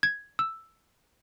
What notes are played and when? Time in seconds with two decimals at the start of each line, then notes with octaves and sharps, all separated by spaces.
0.03 G#6
0.39 E6